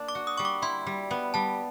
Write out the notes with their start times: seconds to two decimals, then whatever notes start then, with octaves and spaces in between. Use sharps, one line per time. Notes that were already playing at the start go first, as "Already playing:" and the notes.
Already playing: A#3 D4
0.09 D6
0.15 F#4
0.27 D#6
0.38 G3 C#6
0.45 D6
0.62 E4 C6
0.86 G3
1.11 B3
1.34 G3 A5